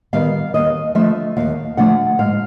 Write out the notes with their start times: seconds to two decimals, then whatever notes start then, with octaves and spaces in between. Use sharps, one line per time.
0.13 D#3 G3 B3 F5
0.54 D#2 D#5
0.95 D3 F3 A3 E5
1.37 D#2 F5
1.77 D3 F3 A3 F#5
2.19 G#2 F5